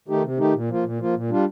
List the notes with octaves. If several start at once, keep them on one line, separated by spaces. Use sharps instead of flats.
D#3 A3 D#4 G4
C3
D#3 A3 D#4 G4
A#2
F3 A#3 F4
A#2
F3 A#3 F4
A#2
G3 D4 F4